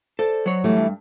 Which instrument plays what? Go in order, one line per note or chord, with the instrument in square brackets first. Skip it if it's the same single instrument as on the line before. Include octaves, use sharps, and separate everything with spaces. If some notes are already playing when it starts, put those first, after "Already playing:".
[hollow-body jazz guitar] A4 [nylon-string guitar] C5 D5
[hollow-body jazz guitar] F#3 C#5
[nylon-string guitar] E3 G3 A3
[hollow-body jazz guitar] G2